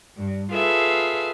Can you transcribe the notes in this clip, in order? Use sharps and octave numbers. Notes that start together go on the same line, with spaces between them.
G2
F4 G#4 A4 B4 E5 F5